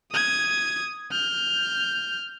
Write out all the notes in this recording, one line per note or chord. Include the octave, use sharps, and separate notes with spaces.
D#6 G#6
F6 G6